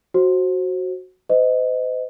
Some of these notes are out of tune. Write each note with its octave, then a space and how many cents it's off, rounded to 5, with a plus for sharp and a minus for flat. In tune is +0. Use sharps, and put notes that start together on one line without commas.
F#4 +0 C5 +20
C5 -40 D#5 +5